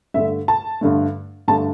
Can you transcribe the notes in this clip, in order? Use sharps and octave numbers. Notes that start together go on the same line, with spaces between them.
G2 D3 A3 E5
A5
G2 D3 A3
G2 D3 A3 A5